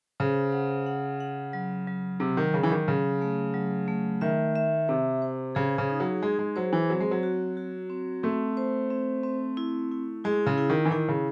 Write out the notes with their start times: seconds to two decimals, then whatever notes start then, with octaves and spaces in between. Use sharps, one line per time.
0.20 C#3 C5
0.52 F#5
0.86 F#5
1.20 F#5
1.53 F#3
1.88 F#3
2.20 C3 F#3
2.37 D#3
2.53 C#3 F#3
2.63 E3
2.71 D#3
2.88 C#3 F#3
3.22 A3
3.54 F#3
3.88 A3
4.21 D#3 E5
4.56 E5
4.88 C3 C5
5.22 C5
5.55 C#3 G#4
5.78 C#3
5.89 D#4
6.00 F#3
6.22 G#3 G#4
6.39 G#3
6.56 F#3 C5
6.73 E3
6.90 F#3 C4
7.00 G#3
7.11 F#3
7.23 F#4
7.57 F#4
7.90 C4
8.23 A3 C4
8.57 C5
8.90 C4
9.24 C4
9.57 E4
9.91 E4
10.24 G#3 E4
10.46 C#3
10.58 E4
10.70 D#3
10.85 E3
10.91 D#3 E4
11.08 C#3